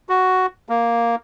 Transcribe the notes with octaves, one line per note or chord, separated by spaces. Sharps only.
F#4
A#3